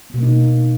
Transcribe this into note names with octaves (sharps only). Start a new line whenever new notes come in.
B2 A#3 B3 D#4